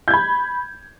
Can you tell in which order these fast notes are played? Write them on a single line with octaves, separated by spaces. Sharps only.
G6 G#6 B5